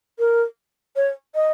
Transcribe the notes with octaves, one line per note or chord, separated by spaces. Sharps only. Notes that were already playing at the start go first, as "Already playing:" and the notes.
A#4
C#5
D#5